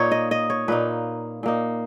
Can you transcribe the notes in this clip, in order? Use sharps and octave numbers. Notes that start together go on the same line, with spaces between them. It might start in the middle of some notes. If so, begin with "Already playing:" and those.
Already playing: A#2 A#3 D#4 C#5
D#5
D#5
C#5
A#2 A#3 D#4 B4
A#2 A#3 D#4